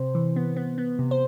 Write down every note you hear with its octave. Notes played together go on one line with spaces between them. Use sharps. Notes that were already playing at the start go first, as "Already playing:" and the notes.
Already playing: C3 C5
E3
B3
B3
B3
C3
C5